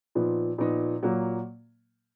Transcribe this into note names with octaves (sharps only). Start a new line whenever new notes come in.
A#2 F3 B3 D#4
A#2 F3 B3 D#4
A#2 F#3 A#3